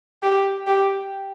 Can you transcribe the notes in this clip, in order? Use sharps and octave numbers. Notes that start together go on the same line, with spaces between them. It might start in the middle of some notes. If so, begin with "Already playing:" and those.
G4
G4